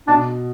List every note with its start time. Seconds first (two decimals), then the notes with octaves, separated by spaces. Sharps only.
0.08 B2 D4